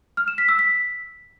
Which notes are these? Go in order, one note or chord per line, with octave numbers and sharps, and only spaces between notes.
F6
E7
B6
E6
B6